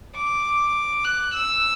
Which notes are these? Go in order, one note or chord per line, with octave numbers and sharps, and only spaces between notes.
D6
F#6
E6